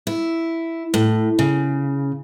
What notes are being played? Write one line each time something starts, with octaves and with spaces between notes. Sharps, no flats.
E4
A2
C#3